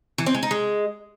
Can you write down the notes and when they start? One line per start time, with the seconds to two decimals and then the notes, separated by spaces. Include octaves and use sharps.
0.18 E3
0.26 C4
0.35 G#3
0.43 D#4
0.51 G#3